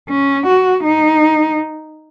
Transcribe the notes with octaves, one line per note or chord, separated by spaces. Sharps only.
C#4
F#4
D#4